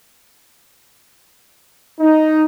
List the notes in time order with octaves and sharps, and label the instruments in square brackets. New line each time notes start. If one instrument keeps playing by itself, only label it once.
[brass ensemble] D#4